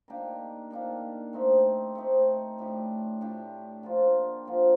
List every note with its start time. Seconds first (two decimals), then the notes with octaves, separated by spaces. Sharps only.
0.08 D#3 A#3 D4 G4
0.71 D#3 A#3 D4 G4
1.33 A3 C4 D#4 G4
1.95 A3 C4 D#4 G4
2.58 A2 A3 D4 G4
3.21 A2 A3 D4 G4
3.83 D3 F3 A#3 F4
4.45 D3 F3 A#3 F4